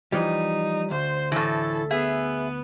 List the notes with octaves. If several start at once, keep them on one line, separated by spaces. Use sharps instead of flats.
E3 F3 G3 D#4
D2 C5
A2 E3 A4
B3 G#4 E5